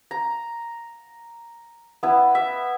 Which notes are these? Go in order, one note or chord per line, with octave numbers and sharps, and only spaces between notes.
A#5
B3 E4
E5